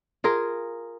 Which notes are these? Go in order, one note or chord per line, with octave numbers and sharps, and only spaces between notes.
F4 G#4 A#4